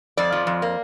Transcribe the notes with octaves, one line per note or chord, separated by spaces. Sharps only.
F2 D5
F3
F2
A#3